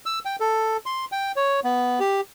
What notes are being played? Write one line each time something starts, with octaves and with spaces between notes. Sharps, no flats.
E6
G5
A4
C6
G5
C#5
B3
G4